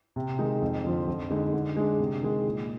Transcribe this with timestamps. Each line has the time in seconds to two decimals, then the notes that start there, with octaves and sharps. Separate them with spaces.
0.16 C3
0.39 D#3 G#3 D#4
0.62 F2
0.85 D3 F3
1.07 F2
1.30 D3 G#3 D#4
1.54 D3
1.77 G#3 D4
1.99 C3
2.22 D#3 G#3
2.45 A#2